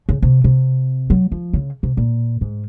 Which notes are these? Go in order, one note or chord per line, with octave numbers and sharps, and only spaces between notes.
C#3
C3
C3
F#3
F3
C#3
C3
A#2
G#2